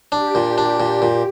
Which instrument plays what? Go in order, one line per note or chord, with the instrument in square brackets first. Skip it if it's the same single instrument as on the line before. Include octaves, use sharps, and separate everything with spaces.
[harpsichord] D4 [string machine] G4
[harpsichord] A#2
D4
A#2
A#2